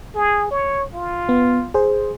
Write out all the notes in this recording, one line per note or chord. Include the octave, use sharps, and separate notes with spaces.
G#4
C#5
F4
B3
G#4 C5